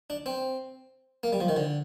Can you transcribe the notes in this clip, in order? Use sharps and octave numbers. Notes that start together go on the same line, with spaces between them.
D4
C4
A#3
G3
F3
D#3
D3